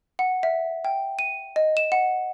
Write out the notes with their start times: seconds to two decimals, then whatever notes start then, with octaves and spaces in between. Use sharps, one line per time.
0.19 F#5
0.43 E5
0.85 G5
1.19 D#7
1.56 D#5
1.77 E7
1.92 F#5